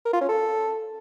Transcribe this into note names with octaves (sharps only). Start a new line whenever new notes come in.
A#4
F4
C#4
A4